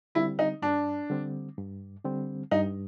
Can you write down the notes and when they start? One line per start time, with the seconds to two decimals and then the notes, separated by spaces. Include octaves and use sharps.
0.15 D3 G3 C4 E4
0.39 D#4
0.62 G2 D4
1.10 D3 G3 C4
1.58 G2
2.04 D3 G3 C4
2.51 G2 D#4